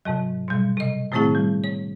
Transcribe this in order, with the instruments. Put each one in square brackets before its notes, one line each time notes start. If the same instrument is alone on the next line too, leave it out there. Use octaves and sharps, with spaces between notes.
[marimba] G#2 C3 F#3
B2 G3
C3 D#5
A2 D#3 A3 C4 E4 G#4
G3
C#5